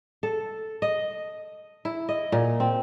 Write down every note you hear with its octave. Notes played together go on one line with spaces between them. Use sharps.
A4
D#5
E4
D#5
A#2
C4